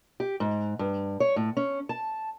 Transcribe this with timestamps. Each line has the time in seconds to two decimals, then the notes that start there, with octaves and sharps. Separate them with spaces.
0.20 G4
0.40 G#2
0.79 G2
1.20 C#5
1.36 A2
1.57 C#4
1.89 A5